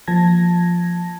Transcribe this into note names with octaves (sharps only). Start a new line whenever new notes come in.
F3 A#3 A5 G#6 A#6